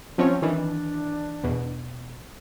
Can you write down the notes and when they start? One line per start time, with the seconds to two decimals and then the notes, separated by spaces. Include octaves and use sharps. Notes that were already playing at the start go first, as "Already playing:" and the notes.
0.18 F3 C4 C#4 C#5
0.42 D#3 E3 D4
1.43 E2 B2